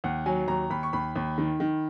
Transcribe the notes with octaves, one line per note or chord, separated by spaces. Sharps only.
D#2 F#5
F#3 G#5
D#2 A#5
D#2 B5
C#6
D#2 B5
D#2
D#3
D#3